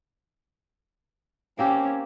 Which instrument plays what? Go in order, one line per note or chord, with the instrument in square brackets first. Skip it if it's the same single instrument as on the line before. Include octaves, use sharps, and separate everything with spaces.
[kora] A#3 C4 G4 [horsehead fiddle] C#4